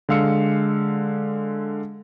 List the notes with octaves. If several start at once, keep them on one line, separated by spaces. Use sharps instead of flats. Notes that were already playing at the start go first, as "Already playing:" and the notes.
D3 G#3 F5 E6 C#7